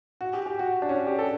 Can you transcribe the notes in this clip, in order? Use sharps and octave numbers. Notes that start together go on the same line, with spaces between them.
F#4
G4
G4
F#4
D4
C#4
G4
A4